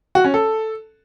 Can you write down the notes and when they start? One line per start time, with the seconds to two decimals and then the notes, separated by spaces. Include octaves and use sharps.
0.15 F#4
0.24 C#4
0.34 A4